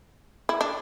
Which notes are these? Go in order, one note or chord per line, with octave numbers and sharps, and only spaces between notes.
E4
D4